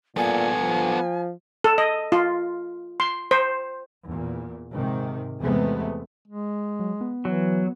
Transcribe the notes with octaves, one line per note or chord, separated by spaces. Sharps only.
A#2 B3 A4 G#5
F3
A4
D#5
F4
C6
C5
E2 A#2
G#2 C3 D#3
E2 C3 G#3 A3 B3
G#3
F#3
B3
E3 F#3